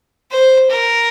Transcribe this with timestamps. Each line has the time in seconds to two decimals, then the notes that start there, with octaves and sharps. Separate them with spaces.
0.31 C5
0.70 A#4